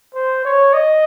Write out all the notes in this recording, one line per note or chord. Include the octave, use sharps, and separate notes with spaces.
C5
C#5
D#5